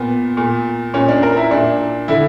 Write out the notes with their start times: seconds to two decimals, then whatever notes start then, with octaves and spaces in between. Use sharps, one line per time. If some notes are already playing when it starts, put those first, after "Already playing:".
Already playing: A#2 B3
0.37 A#2
0.94 A#2 C#4
1.08 D4
1.23 A#4
1.37 E4
1.51 A#2 D4
2.08 D3 E4